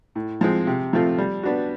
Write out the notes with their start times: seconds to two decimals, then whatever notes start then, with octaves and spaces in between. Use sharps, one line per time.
0.15 A2
0.41 F3 G#3 C4
0.67 C3
0.93 F3 A3 C4 F4
1.18 G3
1.43 B3 D4 F#4